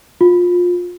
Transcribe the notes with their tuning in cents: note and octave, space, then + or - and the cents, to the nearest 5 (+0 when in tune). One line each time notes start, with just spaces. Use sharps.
F4 +25